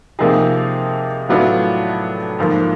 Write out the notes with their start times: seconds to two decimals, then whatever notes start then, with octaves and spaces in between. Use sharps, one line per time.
0.19 C3 F3 A#3 D#4 G#4
1.29 A2 F#3 B3 D4 F4
2.39 G#2 F3 A#3